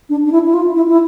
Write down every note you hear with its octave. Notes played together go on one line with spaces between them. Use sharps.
D4
D4
E4
E4
F4
E4
E4